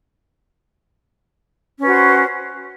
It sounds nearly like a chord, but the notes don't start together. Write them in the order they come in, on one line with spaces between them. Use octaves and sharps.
C#4 B4 F#4 C5